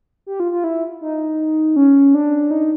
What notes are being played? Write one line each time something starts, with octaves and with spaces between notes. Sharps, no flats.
G4
F4
F4
E4
D#4
C#4
D4
D#4